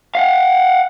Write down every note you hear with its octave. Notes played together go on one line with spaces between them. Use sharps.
F5 F#5